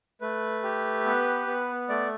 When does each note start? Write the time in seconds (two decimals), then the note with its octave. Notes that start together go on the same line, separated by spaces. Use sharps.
0.21 A3 B4
0.63 G4
1.05 B3
1.47 B3
1.89 A3 D5